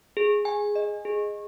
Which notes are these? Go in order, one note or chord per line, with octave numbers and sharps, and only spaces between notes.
G#4
G#5
D#5
G#4